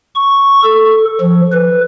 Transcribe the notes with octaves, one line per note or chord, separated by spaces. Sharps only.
C#6
A4
F3
B4